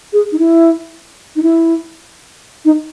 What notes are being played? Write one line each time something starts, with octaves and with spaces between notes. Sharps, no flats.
G#4
D#4
E4
D#4
E4
D#4